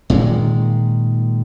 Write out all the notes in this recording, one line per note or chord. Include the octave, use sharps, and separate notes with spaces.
A#2 D#3 G#3